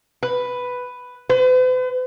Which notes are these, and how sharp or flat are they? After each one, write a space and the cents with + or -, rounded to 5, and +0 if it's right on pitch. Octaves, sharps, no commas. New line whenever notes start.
B4 +5
B4 +45